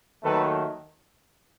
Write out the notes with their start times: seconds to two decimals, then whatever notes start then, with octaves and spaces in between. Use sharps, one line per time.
0.23 D#2 D#3 F#3 A3 A4 B4